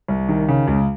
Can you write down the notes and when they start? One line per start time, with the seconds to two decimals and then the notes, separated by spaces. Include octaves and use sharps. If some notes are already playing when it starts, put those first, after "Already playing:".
0.08 C2
0.29 D#3
0.48 C#3
0.67 C#2